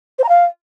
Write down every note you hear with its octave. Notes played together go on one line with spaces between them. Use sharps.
C5
A#5
F5